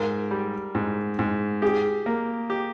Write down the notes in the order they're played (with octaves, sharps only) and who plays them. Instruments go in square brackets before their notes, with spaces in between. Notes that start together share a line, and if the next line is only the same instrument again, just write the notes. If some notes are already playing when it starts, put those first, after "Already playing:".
Already playing: [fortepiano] G#2 [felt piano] A#4
[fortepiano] G3
G#2
G#2
[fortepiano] G4 [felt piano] G#4
[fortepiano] A#3
G4